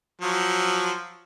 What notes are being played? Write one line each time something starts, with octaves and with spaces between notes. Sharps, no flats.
F3 F#3